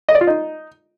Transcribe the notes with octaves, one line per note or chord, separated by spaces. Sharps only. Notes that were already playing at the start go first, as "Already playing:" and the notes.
D#5
D5
F4
D#4